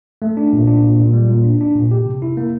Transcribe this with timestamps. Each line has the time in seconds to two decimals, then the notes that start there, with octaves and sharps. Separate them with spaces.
0.22 A3
0.37 D4
0.53 A#2
0.67 D4
0.83 A#2
0.99 A#2
1.13 G3
1.29 A#2
1.44 D4
1.61 D4
1.76 A#2
1.91 G4
2.06 C3
2.22 E4
2.37 A#3